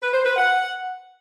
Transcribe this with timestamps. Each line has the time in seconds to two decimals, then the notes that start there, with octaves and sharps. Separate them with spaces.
0.02 B4
0.13 C5
0.25 B4
0.36 F#5